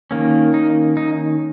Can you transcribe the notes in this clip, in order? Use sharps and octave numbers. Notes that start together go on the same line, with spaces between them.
D#3 A#3 C#4
D#4
D#4